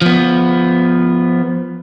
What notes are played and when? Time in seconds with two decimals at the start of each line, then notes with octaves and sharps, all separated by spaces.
0.02 F3 B3